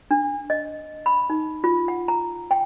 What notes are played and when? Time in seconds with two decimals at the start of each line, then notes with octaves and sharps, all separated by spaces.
0.11 D4
0.50 D#5
1.06 B5
1.30 D#4
1.64 F4
1.88 F#5
2.08 A#5
2.51 G5